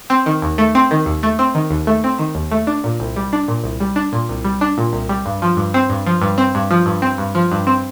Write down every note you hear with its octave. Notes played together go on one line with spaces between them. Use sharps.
C4
D#3
D#2
A3
C4
D#3
D#2
A3
C4
D#3
D#2
A3
C4
D#3
D#2
A3
D4
A#2
C2
G3
D4
A#2
C2
G3
D4
A#2
C2
G3
D4
A#2
C2
G3
G2
F3
G2
C4
G2
F3
G2
C4
G2
F3
G2
C4
G2
F3
G2
C4